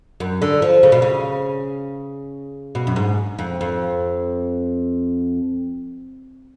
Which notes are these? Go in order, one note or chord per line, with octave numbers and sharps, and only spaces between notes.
F#2
D3
F3
C#3
B2
C#3
B2
F#2
G#2
F2
F2